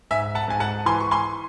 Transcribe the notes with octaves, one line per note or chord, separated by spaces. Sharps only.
G#2 E5 G#5
F#5 A5
G#2 G#5
F#5 A5
E3 G#5 C6
C#6
G#5 C6